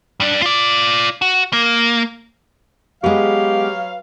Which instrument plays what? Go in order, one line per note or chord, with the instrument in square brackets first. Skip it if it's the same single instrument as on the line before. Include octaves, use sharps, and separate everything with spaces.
[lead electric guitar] G2 D4
F4 D5
F#4
A#3
[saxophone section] F#3 B4 F5 [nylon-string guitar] G#3 B3 [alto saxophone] G4